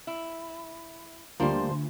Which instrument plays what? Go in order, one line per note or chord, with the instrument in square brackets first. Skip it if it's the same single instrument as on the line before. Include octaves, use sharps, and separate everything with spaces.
[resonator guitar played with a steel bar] E4
[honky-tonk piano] D2 F4 [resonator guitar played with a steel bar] F3 C5 [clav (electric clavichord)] G3 A#3